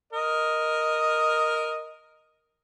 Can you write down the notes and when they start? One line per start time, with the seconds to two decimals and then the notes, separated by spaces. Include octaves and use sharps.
0.13 A#4 D#5